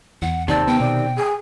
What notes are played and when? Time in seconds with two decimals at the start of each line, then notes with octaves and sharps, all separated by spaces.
0.22 E2 F#5
0.48 D#2 C3 D#3 C4 D5 A5
0.68 B3 G5
0.80 B2 D5
1.17 G#4